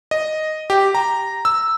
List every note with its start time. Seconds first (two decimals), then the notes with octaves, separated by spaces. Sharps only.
0.11 D#5
0.70 G4
0.95 A#5
1.45 E6